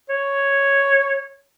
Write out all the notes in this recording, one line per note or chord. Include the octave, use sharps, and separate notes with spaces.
C#5